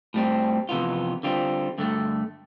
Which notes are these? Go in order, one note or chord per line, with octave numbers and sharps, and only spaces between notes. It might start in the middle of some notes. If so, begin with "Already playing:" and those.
A2 G3 C4
F2 C3 E3 B3 F4
D3 G3 C4 F4
G2 D3 A3